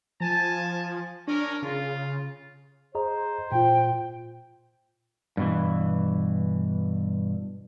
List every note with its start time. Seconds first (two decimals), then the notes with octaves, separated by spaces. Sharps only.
0.20 F3 G#5 A5
1.28 C#4 D4 A#4
1.62 C#3 F4
2.95 G#4 C5 D#5 A#5
3.52 A#2 F4 G5
5.37 G2 B2 E3